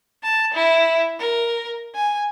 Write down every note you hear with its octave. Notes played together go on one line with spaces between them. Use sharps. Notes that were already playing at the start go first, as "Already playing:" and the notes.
A5
E4
A#4
G#5